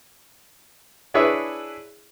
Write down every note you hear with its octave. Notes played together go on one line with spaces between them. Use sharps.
D4 E4 G#4 B4 C#5 E5